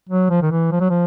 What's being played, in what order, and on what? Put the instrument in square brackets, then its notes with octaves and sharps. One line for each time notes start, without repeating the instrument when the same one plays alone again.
[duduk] F#3
F3
D#3
E3
F3
F#3
F3